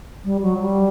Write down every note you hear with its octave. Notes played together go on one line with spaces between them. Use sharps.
G3
F#3
G3